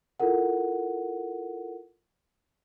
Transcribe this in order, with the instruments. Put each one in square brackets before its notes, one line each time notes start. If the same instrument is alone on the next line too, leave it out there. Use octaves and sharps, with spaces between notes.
[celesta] E4 F4 A4 A#4 F#5